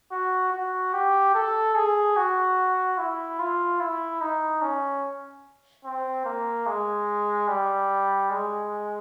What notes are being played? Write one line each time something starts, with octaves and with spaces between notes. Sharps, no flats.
F#4
F#4
G4
A4
G#4
F#4
E4
F4
E4
D#4
C#4
C4
A#3
G#3
G3
G#3